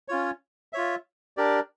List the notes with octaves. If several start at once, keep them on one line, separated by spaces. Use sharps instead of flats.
C#4 F4 C#5
F4 C#5 E5
D4 G4 A#4 D5